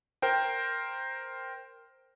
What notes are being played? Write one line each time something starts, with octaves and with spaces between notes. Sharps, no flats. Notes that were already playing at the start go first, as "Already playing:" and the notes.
A#4 C5 G5